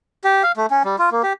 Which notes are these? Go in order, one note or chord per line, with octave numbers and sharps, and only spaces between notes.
G4
F5
A3
C#4
G3
F4
A#3
G4